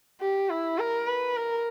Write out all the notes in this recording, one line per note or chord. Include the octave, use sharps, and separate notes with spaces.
G4
E4
A#4
B4
A#4